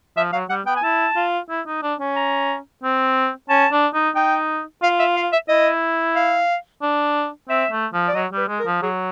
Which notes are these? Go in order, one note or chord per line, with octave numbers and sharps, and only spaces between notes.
F3 E5
F#3 F5
G3 F#5
B3 G5
G#5
E4 A5
F4
E4
D#4
D4
C#4
A#5
C4
C#4 A5
D4
D#4
D#4 G5
F4 F5
E5
F5
E5
E4 D#5
F5
D4
C4 E5
A3
F3
D5
F#3 D#5
G3 B4
G#3
A#4
F3
F#3 G#4